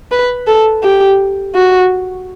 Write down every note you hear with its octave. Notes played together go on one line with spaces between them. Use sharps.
B4
A4
G4
F#4